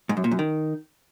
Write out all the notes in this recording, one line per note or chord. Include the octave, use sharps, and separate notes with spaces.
G#2
F#2
A#2
F#2
D#3